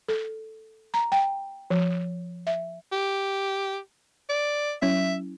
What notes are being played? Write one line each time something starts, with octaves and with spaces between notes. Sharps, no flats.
A4
A#5
G5
F3
E5
G4
D5
F#3 C#4 E4 E5